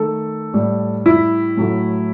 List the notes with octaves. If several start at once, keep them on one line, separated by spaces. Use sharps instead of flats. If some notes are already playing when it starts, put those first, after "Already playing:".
Already playing: D#3 A3 A4
A2 G3
E4
A2 F#3 A3